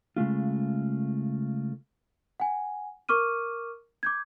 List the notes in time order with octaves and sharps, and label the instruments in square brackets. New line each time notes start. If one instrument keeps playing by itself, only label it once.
[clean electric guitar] C#3 G#3 A3 F4
[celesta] F#5 G#5
A#4 C#6 D6 F6 D#7
D6 G6 G#6